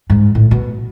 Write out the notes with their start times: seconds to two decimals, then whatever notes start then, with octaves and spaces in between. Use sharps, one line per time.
0.10 G#2
0.35 A2
0.51 B2